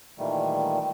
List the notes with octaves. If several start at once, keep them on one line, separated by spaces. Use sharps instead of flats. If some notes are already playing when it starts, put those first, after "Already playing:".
A#2 D#3 E3 G3 A3